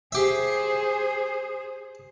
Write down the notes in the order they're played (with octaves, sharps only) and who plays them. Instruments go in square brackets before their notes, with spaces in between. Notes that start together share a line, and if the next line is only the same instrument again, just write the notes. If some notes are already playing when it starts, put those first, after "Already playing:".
[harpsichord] G4 E5 [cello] G#4 C5